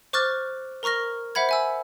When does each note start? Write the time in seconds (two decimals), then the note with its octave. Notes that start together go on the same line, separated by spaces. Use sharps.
0.13 C5 C#6 D6 F6 F#6 A6
0.83 A#4 A#5 C#6 F6 A#6
1.35 C5 E5 F#5 B5 G#6
1.49 E5 G#5 E6